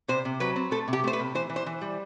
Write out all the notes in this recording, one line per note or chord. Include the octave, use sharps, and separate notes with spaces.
C3 C5
C3
F#3 B4
C4
A3 A4
C3
G4
A3 C5
B4
C3
E3 C5
E3
C5
E3
G3